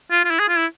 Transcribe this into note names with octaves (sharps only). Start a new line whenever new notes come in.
F4
F4
E4
G#4
F4
E4